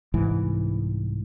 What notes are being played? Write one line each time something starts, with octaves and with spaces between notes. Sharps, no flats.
C2 G#2 E3